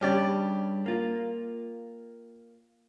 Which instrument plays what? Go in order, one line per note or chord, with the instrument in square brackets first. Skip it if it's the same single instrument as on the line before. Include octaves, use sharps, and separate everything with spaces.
[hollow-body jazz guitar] G2 C#3 [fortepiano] C#4 G4 D5
[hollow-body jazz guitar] A#3 F4